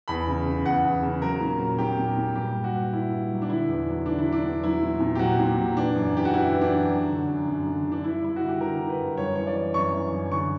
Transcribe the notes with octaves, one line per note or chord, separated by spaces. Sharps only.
E2 B5
C#3
C#3
E2 F#5
E2
C#3
F#3 A#4
A#2
F#3
A#2 G4
A#2
A#2
G2 G4
G2
F#4
G2
G2 E4
G2
F#3
D4
D3 E4
E2
D4
F#3
D3 D4
E4
F#3
D4
E2
F#3 E4
A#2
A#2
G4
F#3 F#4
A#2
F#3
E3 D4
F#2
E3 G4
F#4
E3 E4
E3
D4
F#2
F#3
D3
F#2
F#2
D3
D3
D4
G2 E4
G2 E4
F#4
D3
G4
D3 A#4
D3
B4
G2
F#2 C#5
E3 C#5
D5
E3
F#2 C#6
E3
F#2
D3 C#6